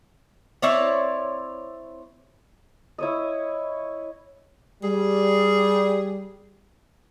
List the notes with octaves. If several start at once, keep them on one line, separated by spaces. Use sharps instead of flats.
C4 E4 C#5 D5
E4 C#5 D#5
G3 G#4